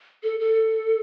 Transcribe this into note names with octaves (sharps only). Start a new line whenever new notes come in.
A4
A4